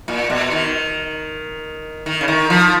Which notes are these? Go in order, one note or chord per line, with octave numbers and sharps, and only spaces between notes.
A#2
B2
D#3
D#3
C#3
D#3
F3